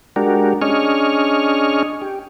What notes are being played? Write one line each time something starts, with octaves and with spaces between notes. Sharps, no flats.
G#3 D4 F#4 G4 A#4
C#4 D4 G#4 D#5 C#6 F6
G4